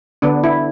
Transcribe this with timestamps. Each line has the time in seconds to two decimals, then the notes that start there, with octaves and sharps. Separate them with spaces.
0.22 D3 B3 D4
0.44 E4